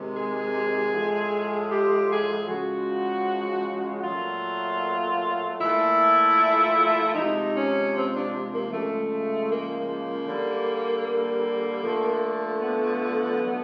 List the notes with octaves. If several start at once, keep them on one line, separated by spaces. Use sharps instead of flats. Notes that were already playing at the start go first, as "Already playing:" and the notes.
Already playing: C3 D#3 G#3
G#4
A2 F3 G#3
G4
G#4
C#3 F3 G#3 F#4
A#2 F#3 A3 F4
A#2 F3 A3 E4
C3 F3 G#3 D#4
C#4
C4
D4
A#3
C#3 F3 G#3 A3
A#3
D3 G3
A#3
D3 F3 A3
B3
D3 F#3 A3